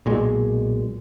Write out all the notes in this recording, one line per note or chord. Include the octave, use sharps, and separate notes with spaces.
B1 A#2 G#3